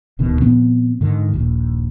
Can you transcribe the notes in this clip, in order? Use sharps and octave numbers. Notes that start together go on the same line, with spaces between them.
D#1 D2 B2 D#3
A#2 F3 B3 C4
G#2 D3 D#3
D#1 A#1 D#2